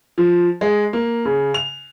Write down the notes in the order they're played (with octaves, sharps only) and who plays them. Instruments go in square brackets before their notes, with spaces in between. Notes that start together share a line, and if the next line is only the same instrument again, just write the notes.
[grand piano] F3
G#3
A#3
C#3
F7